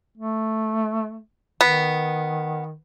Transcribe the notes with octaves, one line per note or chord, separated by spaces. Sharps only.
A3
D#3 B3